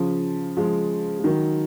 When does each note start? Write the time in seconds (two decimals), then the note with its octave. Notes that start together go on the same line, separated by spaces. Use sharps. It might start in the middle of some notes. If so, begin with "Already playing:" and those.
Already playing: C#3 F3
0.57 F3 G#3
1.19 G#3
1.24 D#3 F#3